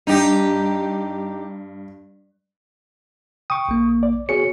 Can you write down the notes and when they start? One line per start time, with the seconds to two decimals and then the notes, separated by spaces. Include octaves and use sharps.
0.07 G2 D#4 G4
3.50 G5 C#6 D#6
3.69 A#1 A#3
4.03 D5
4.29 B3 F#4 G#4 C#5 C#7